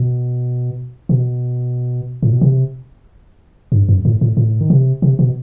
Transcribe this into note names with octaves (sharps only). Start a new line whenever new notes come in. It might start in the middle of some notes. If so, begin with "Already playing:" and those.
Already playing: B2
B2
A2
B2
C3
G2
F#2
A2
A2
A2
D#3
C3
C3
B2